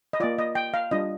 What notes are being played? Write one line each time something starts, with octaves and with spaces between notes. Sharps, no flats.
D#5
A#3 F4 D5
D#5
G5
F5
G3 D4 F4 D#5